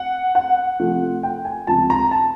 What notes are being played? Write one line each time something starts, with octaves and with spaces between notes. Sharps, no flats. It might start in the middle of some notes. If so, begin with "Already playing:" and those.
Already playing: F#5
F#5
C3 F3 A3
G5
G#5
C#2 C3 F3 A5
A#5
A5